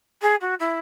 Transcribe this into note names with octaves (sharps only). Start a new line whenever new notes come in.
G#4
F#4
E4